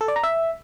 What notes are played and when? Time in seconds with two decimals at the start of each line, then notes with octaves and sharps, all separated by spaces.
0.01 A4
0.08 D5
0.16 A#5
0.23 E5